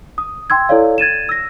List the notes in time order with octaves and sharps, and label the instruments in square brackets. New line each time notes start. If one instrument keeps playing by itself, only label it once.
[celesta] D#6
G5 C6 E6 G#6
E4 A4 C#5 D5 F5
G#6 A6 D#7 E7
E6 A#6